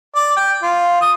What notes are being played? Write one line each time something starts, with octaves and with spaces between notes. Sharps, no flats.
D5
G5
F4
D#6